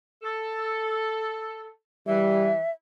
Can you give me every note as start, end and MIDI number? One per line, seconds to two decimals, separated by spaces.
0.22 1.68 69
2.07 2.58 52
2.07 2.51 55
2.07 2.71 76